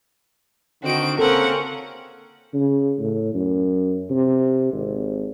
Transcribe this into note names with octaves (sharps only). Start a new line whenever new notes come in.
D3 D#3 C4 F#4 D#5 D7
C#3 A#3 C4 C#4 A4 A#4 F#5 C#6
C#3
A2
F#2
C3
G#1